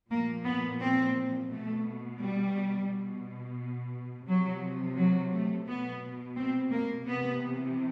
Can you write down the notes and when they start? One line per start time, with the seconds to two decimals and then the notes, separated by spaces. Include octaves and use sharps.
0.10 A#2 F3 A#3
0.45 B3
0.80 C4
1.49 B2 A3
2.19 G3
2.89 B2
4.28 C3 F3 F#3
4.97 F#3
5.32 A3
5.67 B2 B3
6.37 C4
6.72 A#3
7.06 C3 E3 B3